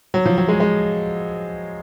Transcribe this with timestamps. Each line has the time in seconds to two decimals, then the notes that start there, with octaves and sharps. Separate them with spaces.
0.14 F#3
0.26 F3
0.38 F#3
0.49 G#3
0.60 G#3